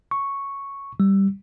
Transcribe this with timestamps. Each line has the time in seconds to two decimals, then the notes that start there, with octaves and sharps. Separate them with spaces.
0.11 C#6
1.00 G3